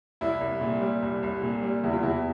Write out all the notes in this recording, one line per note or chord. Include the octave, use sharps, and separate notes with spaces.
C2 E4
C2
A#2
G3
C2
C2
A#2
G3
E2 E4
F4
E2 E4